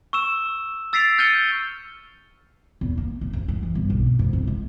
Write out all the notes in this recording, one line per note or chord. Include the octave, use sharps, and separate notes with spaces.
C#6 E6 E7
E6 A6 B6 C7 D7 F7
F6 G6 A6 C#7 D#7 G7
E2
A#3
A3
D2
G#3
E3
G1
B1
B2
G#2
C3
G#3